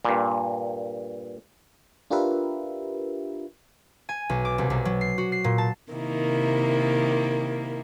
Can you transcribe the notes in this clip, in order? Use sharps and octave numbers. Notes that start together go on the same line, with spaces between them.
G2 A#2
D4 F4 G4 A#4 B4 E5
G#5
B1
D6
C2
B1
F#3
C7
F#4
C7
A#2
A5
C3 D#3 A#3 E4